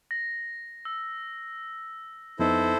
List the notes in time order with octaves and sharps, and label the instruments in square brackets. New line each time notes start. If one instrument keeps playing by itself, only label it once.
[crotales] A#6
E6
[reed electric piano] F2 B3 D#4 [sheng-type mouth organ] E4 A4 C5